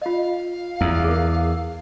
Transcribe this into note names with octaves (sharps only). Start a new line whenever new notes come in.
F4 D#5 F5
E2 E4
G#4 A#4